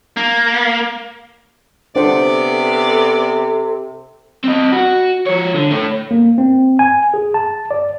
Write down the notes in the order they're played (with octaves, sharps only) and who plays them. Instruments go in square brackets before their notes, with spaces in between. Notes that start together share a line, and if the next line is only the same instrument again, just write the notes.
[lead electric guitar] A#3
[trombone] C3 [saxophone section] B3 D5 [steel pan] D4 C5 F#5 [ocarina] A4
[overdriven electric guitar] C4 D#5
F#4
F3 C#5
D3
A3 C#5
[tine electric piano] A#3
C4
G#5
G#4
A5
D5